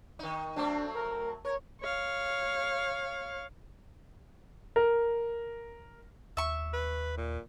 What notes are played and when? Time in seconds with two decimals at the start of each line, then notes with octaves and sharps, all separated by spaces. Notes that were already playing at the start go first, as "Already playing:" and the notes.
0.19 D#3 D#4
0.56 F#3 A3 C4 D4
0.95 A#4
1.45 A#4 C#5
1.81 C#5 F5
4.76 A#4
6.37 D#2 E5 C#6
6.73 B4
7.17 A#2